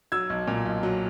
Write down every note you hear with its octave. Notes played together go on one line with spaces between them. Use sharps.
F#3 E6 G#6
B1
A#2
B1
F#3